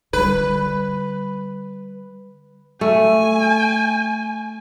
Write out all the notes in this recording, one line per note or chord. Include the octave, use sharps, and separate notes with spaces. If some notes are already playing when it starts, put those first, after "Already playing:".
D3 G3 B4
A3 G#5